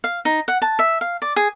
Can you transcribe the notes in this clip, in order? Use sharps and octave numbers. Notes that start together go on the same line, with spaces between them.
F5
D#4
F#5
A5
E5
F5
D5
G#4